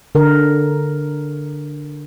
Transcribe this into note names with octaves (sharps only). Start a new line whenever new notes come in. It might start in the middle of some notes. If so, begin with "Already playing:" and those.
D3 A#4